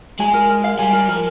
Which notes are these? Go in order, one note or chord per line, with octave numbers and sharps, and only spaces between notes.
G#3 G#5
A#4
A#4
F5
G3 G#5
A#4
F3 A#4